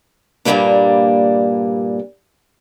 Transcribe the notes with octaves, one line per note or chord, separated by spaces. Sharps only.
G2 A#2 D#3 G3 A#3 D4